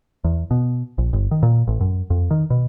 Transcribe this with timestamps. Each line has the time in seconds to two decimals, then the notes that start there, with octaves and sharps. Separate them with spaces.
0.24 E2
0.51 B2
0.98 A#1
1.13 G1
1.31 D#3
1.43 A#2
1.68 A1
1.81 F#2
2.10 F2
2.31 D#3
2.50 B2